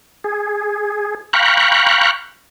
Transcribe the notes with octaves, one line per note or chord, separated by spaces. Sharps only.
G#4
F5 G5 A#5 B5 C#6 F#6